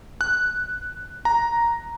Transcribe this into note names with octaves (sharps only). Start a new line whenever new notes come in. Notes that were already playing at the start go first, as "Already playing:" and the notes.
F#6
A#5